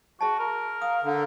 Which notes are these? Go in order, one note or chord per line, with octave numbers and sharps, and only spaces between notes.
F#4 G#4 D#5 A5
A#4
F5 D#6
D3 F5